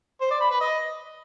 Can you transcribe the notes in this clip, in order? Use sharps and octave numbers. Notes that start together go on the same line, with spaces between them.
C5
D5
B5
B4
D#5